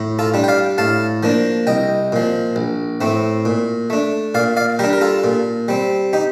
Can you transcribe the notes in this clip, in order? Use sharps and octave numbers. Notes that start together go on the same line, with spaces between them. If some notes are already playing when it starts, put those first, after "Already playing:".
Already playing: A2
F4 A4
G3 D4
G5
D5 F5
A2 F5 A5
F3 A#3 D4
C2 D#5 G5
A#2 F3
A#1
A2 A3 C4
A#2
A3 D4
A#2 D5 F5
D5 F5
G3 D4 G4 A#4
A#4
F4 A4
A#2
G3 C4
D#4 G4